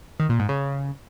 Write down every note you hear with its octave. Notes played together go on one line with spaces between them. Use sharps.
D#3
A#2
G#2
C#3